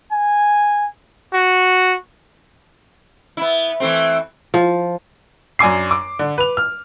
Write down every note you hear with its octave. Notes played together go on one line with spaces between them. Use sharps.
G#5
F#4
B3 E4
E3 A3 C4
F3
F#2 D4 G#5 D6 C7
D6
D3
B4 F7
F6